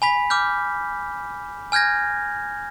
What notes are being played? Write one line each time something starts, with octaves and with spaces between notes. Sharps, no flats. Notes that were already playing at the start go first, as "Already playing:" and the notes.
G#5 B5 B6
D6 F6 G6
G#5 F6 G6 G#6 A#6